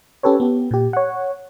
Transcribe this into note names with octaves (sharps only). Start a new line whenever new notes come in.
C#4 G4 A4 B4 C#5
B3 G4
A#2 G4
C#5 F#5